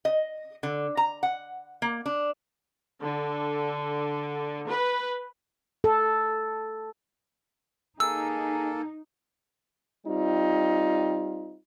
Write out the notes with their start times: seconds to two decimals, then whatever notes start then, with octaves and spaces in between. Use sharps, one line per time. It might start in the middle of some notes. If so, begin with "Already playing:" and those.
0.05 D#5
0.63 D3
0.97 A#5
1.23 F#5
1.82 A#3
2.06 D4
3.00 D3
4.67 B4
5.84 A4
8.00 A#3 D#4 G#4 A4 E6
10.06 G3 C4 D#4 F4